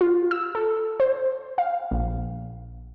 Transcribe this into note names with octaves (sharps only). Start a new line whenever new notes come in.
F4
E6
A4
C5
F5
A#1